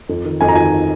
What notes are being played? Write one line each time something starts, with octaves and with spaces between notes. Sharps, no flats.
F2
D#3
F2 G#5
A#5
D#3 G#5